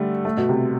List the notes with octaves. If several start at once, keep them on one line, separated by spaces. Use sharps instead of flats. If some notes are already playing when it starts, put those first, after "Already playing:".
Already playing: D3 G3 A3
A3
B2
C3